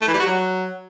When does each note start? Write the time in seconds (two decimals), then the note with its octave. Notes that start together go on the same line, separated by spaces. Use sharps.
0.02 A3
0.08 E3
0.14 G3
0.20 F#4
0.26 F#3